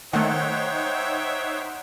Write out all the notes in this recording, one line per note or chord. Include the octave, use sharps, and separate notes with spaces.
D#3 A3 D#4 C5 C#5 E5 F#5 G5